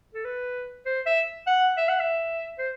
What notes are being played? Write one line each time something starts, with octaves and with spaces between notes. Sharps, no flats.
A4
B4
C5
E5
F#5
E5
F#5
E5
C5